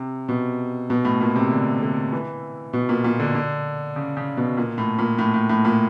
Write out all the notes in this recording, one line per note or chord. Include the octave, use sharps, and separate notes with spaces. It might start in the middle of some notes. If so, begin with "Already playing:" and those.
Already playing: C3
B2
B2
A2
A#2
C3
D3
D3
E3
B2
A#2
A#2
D3
D3
C#3
C#3
B2
A#2
A2
A#2
A2
A2
A2
A#2